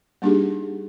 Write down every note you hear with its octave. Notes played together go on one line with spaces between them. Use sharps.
G3 A#3 D4 D#4 G4 G#4